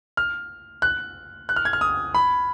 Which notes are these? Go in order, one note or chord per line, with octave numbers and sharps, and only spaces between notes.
F6
F#6
F#6
F6
G#6
F6
D#6
B5